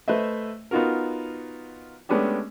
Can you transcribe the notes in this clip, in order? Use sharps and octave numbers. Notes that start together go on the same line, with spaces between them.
A3 B4 C5 D#5 E5
B3 D#4 F4 F#4 A#4
G#3 A3 B3 C#4 D4 G4